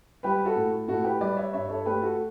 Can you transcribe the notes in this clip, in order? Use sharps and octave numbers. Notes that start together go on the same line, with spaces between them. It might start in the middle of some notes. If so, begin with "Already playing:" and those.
G3 G4 B4
F#4 A4
A2
A2 F#4 A4
G4 B4
G3 B4 D5
C#5 E5
G2 C#5 E5
A4 C#5
A3 G4 B4
F#4 A4